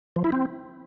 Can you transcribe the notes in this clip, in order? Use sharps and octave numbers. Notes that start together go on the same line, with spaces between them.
F3
E4
C4